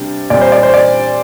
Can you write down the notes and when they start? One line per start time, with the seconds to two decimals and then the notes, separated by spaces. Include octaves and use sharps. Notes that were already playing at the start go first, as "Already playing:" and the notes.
Already playing: C3 G3 D4
0.30 A#2 G3 C4 D5
0.41 C5
0.52 D5
0.63 C5
0.74 D5